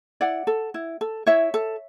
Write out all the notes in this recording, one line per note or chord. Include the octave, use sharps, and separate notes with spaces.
E4 D5 F#5
A4
E4
A4
E4 C#5 E5
A4